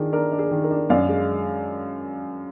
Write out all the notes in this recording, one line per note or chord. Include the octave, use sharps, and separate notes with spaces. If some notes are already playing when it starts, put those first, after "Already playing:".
Already playing: D#3 D4 F4 G#4 A#4
D4 A#4
D4
G#4
D#3
A#4
D4
F#2 D5 F5
G#3